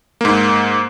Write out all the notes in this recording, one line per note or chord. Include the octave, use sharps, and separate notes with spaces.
G#2 A#3